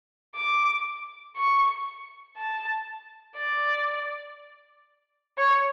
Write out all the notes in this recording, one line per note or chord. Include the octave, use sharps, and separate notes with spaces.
D6
C#6
A5
D5
C#5